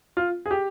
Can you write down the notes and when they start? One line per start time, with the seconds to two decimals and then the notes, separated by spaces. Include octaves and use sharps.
0.17 F4
0.46 G#4
0.51 G4